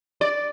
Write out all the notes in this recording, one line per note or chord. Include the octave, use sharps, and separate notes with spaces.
D5